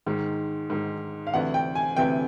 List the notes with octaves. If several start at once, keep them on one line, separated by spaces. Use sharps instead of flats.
G#2 D#3 G#3
G#2 D#3 G#3
F5
D2 C3 E3 F#5
G5
G#5
D2 C3 E3 G5